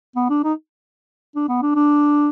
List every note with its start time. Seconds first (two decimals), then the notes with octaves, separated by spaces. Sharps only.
0.16 B3
0.30 D4
0.43 D#4
1.36 D4
1.49 B3
1.62 D4
1.75 D4